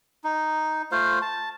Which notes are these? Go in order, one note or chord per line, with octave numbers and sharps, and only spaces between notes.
D#4
A3 F4 C5 F5
A5